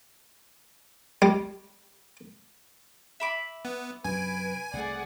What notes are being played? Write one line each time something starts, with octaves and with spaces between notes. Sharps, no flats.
G3
E5 B5 D6
B3
F#2 C3 B4 G#5 D7
C2 A3 G#4 D5 F#5